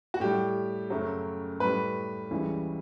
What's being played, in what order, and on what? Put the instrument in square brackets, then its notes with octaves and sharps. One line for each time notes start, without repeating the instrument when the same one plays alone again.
[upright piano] F#4
A2 G3 G4
F#2 C#3 F#3 A3
A2 G3 B4
C#2 C#3 E3 G3